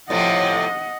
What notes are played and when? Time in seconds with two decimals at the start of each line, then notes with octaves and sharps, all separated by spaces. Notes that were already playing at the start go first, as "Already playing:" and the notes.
0.10 A2 C3 F3 D#5 F#5